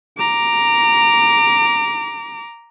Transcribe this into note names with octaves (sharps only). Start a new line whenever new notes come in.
A#5 D6